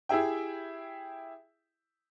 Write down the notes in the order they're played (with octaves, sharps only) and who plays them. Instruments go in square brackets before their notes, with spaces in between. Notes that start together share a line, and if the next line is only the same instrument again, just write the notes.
[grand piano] E4 G4 G#4 E5 G5